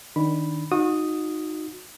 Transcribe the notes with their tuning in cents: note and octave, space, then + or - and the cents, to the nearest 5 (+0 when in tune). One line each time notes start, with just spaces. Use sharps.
D#3 +0 D4 -15 B5 +0
D#4 -5 F#4 -35 D#6 +0